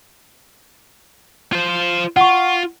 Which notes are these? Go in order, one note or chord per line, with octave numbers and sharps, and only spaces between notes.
F4 C5
F4 F#5 C#6